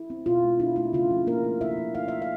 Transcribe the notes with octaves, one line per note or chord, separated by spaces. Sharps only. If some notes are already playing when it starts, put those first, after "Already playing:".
Already playing: E4
C4
B2 F4
G#3
D4 E4
A3 E4
C#3 F4
F3
A#3 D4 A#4
A3
C#3 E4 E5
F3
D#4 F5
A#3 E5
F5